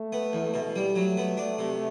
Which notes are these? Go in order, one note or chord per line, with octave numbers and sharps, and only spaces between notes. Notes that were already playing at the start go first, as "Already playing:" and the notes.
Already playing: A3
B3
E2
B2
G3
F#3 A3
B3
D4
C3